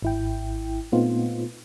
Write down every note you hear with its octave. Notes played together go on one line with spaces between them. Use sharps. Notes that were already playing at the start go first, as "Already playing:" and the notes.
G#1 E4 G5
A#2 A3 B3 C4 D#4 F4